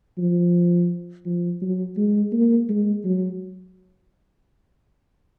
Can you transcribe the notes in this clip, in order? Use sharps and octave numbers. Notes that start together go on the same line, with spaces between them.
F3
F3
F#3
G#3
A#3
G#3
F#3